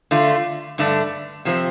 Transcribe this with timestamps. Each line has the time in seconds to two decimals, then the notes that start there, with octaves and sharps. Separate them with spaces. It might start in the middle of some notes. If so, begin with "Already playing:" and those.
0.11 D3 A3 F4
0.78 G2 D3 A3 D4
1.45 C3 F3 C4